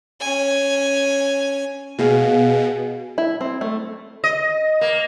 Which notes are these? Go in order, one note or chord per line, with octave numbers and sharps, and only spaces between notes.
C#4 G#5
B2 F#4 G#4 F5
E4
C4
A3
D#5
A#3